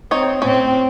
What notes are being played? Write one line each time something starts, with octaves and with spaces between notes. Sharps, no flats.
C4 D#4 C#5
A2 C4 C#4